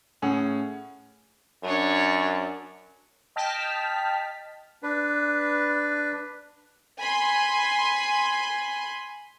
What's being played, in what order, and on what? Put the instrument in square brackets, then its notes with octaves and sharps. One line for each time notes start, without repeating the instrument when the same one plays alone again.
[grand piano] A2 C#4 G#4 F#5
[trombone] F#2 [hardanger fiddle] D4 C#5
[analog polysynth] D#5 G5 A5 F6 B6
[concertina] D4 B4
[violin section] G#5 B5 C6